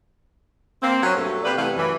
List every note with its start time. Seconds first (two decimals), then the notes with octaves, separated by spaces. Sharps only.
0.82 A#3 C4
1.03 F#3 C#4
1.15 G2 B2 F#3 A3 A4
1.44 C3 A#3 B3 B4 D5
1.57 C3 E3 A3 B3 F5
1.76 F#2 E3